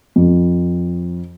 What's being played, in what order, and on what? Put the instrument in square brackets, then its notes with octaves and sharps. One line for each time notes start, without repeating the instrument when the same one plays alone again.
[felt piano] F2